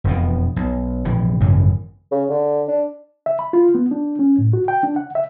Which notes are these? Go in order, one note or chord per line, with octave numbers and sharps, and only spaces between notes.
E1 F2 B2
B1
A#1 C3 E3
G#1 F#2 C#3 E3
C#3
D3
D4
E5
B5
F4
B3
D4
C#4
A2
F#4
G5
D4
F#5
E5